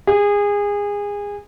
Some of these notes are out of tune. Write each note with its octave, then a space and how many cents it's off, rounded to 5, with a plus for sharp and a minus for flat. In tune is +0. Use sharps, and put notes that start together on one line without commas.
G#4 -25